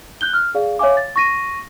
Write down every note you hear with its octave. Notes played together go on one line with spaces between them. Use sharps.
F#6 G6 G7
F6
G#4 D5 F5
C#5 E5 F5 G#5 D6
A6
C#6 A#6 D#7